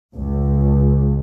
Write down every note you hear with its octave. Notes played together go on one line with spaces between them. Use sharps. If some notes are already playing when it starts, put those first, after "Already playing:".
C#2